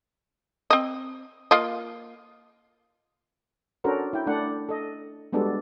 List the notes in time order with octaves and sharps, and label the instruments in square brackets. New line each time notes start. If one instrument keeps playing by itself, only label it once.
[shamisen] C4 D#5
A#3 F4 D#5
[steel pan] C#4 D4 F#4 A4 A#4 C5
E4 G5
A3 D4 F#5
A4 D#5
G3 G#3 B3 D4 F#4 A4